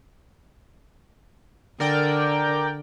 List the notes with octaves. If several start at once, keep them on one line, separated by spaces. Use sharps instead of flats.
D3 A#4 D5 G5